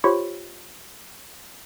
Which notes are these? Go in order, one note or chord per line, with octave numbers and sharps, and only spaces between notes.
F4 G4 C5 C#5 B5 C#6